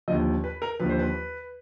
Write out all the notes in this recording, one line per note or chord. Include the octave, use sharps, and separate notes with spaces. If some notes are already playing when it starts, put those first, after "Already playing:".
D#2 D3 F3 D#5
B4
A#4
D#2 D3 F3 B4
C5
B4